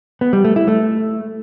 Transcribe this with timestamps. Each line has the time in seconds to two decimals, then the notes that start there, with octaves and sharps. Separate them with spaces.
0.21 B3
0.33 G3
0.45 A3
0.56 E4
0.68 A3